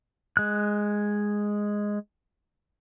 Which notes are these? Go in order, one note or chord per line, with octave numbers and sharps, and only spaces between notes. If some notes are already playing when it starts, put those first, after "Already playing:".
G#3 F#6